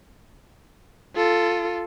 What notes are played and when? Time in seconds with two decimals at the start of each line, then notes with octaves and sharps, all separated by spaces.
1.16 F4 A4